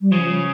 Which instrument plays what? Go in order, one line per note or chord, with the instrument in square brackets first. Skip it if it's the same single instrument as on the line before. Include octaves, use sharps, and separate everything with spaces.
[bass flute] G3
[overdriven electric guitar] C#3 [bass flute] F3